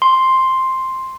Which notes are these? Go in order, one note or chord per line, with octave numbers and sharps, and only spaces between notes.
C6